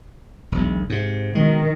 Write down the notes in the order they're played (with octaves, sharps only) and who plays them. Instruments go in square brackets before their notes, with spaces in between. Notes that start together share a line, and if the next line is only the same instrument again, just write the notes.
[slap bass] E1 B1
G#2 C3
[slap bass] B2 G#3 [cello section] D#3